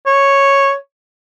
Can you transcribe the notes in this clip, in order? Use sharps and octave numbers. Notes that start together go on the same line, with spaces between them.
C#5